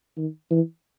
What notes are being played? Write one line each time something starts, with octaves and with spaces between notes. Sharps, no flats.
D#3
E3